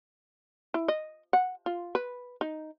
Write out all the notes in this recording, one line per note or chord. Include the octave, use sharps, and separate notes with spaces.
E4
D#5
F#5
F4
B4
D#4